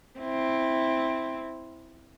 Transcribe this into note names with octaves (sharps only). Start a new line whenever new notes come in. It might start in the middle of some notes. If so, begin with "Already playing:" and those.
C4 E4